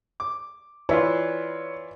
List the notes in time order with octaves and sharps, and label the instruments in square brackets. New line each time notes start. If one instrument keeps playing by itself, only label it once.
[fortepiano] D6
[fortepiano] E3 E4 F4 [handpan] B4 D5 [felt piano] C#5